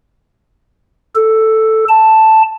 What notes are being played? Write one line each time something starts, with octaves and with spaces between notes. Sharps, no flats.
A4
A5